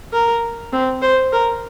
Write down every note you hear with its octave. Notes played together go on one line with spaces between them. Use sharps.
A#4
C4
C5
A#4